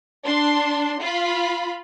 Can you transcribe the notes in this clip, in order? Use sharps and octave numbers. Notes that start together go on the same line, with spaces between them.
D4 C6
F4 B5